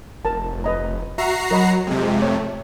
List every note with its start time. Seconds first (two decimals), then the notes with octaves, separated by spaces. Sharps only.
0.25 F1 A#4 A5
0.64 B4 D#5 A#5
1.18 F#4 E5 A#5 C7
1.51 F#3 A#4 D#5 B5
1.87 F2 C3 G#3
2.22 A3 C#5